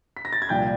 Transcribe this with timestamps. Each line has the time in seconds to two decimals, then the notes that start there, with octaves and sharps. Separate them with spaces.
0.17 B6
0.25 A#6
0.33 A6
0.42 G#6
0.49 C2 A#2 F3 G5 G6